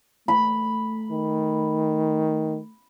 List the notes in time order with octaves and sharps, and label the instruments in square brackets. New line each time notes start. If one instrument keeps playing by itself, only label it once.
[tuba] A3 [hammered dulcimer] B5
[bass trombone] D#3